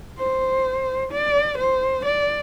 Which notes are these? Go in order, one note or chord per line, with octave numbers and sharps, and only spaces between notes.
C5
D5
C5
D5